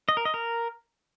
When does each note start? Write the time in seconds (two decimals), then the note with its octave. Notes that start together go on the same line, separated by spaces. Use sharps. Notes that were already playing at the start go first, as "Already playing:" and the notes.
0.09 D#5
0.17 A#4
0.25 D#5
0.34 A#4